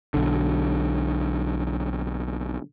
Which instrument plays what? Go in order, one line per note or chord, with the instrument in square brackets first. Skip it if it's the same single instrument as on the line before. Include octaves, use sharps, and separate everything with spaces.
[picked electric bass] B1 D3